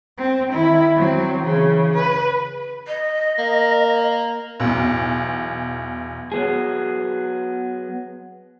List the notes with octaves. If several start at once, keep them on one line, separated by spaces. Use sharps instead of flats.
C4
D#3 E4
F#3 C4
C#3 E3
B4
D#5
A#3
B1 E2
F#3 B3 G#4